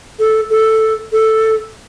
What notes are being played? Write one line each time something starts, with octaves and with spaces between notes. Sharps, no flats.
A4
A4
A4